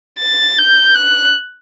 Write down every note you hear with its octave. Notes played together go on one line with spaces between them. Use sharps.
A6
G6
F#6